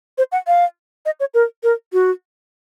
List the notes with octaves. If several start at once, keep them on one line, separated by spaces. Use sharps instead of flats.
C5
F#5
F5
D#5
C#5
A#4
A#4
F#4